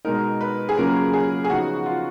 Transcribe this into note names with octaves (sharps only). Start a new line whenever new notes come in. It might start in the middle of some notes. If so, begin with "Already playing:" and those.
B2 G#3 D#4 A#4
B4
G#4
C#3 F#3 A#3 C#4 F4 A#4
G#4
G#4
C#3 F3 B3 D#4 F#4
F4